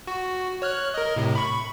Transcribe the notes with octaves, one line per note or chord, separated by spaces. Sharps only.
F#4
C#5 F6 F#6
A#4 D#5
A2 C3
B5 C#6